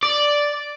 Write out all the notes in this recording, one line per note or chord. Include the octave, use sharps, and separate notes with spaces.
D5